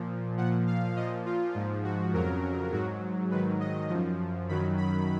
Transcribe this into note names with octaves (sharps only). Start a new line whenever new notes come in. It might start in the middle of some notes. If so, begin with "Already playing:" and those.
Already playing: A#2 F3
A#2 F3 F#5
F5
A#2 F3 D#5
F4
G#2 F3
F#4
F2 C#3 F#3 A#4
G#2 F#3 F#4
G#2 D#3 F#3 B4
D#5
F#2 F3
F#2 D#3 F#3 B5
B5